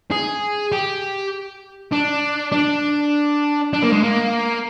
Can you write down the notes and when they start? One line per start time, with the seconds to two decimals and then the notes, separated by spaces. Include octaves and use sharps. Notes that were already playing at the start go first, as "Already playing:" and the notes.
0.12 G#4
0.72 G4
1.92 D4
2.52 D4
3.73 D4
3.83 A#3
3.93 G#3
4.03 A#3